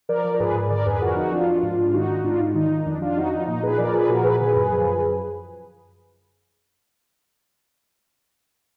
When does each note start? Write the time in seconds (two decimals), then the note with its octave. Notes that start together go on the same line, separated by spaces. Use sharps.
0.09 F3 A#4 D5
0.24 F3
0.34 A#4
0.40 G#2 G#4 B4
0.55 G#2
0.70 D3 A#4 D5
0.86 F2 G#4 B4
1.01 F3 F#4 A#4
1.17 F2 D#4 F#4
1.32 F3 D4 F4
1.47 F3
1.63 G#2
1.78 G#2
1.94 D#3 D#4 F#4
2.09 D#3
2.24 G#2 D4 F4
2.40 G#2 D#4
2.55 D#3 D#4
2.70 D#3
2.86 F2 D4
3.01 F2 D4 F4
3.17 F3 D#4 F#4
3.32 F3 D#4
3.47 A#2 D#4
3.63 A#2 G#4 B4
3.78 F3 A#4 D5
3.94 F3 G#4 B4
4.09 A#2 F#4 A#4
4.24 A#2 G#4 B4
4.40 D3 G#4 B4
4.55 F#2 G#4 B4
4.71 F3
4.86 F#2